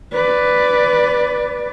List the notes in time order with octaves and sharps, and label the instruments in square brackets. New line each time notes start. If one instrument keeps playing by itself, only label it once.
[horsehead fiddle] B4 D5